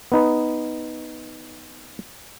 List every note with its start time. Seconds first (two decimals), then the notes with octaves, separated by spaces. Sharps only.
0.12 B3 D#4 B4